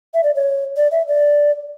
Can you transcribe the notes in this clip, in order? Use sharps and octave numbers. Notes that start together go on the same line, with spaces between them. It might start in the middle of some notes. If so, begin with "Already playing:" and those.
E5
D5
C#5
D5
E5
D5